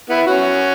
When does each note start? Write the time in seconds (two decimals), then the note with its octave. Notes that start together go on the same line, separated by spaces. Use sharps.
0.10 B3 E4
0.26 C#4 F#4